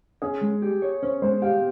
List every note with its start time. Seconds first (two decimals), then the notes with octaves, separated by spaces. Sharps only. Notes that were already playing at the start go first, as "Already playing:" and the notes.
0.22 C#4 G#4
0.41 G#3
0.62 G4
0.82 C#5
1.02 C#4 C5
1.22 G#3 C5
1.42 G4 F5